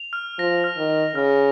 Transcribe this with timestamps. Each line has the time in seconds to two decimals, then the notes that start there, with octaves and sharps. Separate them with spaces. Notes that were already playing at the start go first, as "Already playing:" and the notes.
Already playing: F7
0.13 F6
0.39 F3 A#6
0.64 F6
0.77 D#3
0.90 F7
1.15 C#3 F6